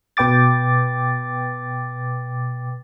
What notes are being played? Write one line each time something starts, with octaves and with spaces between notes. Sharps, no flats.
B2 B4 G5 D6 A6